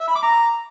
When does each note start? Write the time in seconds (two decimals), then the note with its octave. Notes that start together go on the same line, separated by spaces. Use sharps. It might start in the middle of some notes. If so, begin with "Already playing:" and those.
0.01 E5
0.08 B5
0.16 D6
0.23 A#5